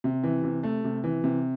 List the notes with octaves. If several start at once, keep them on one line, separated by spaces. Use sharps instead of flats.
C3
E3
C3
A3
C3
E3
C3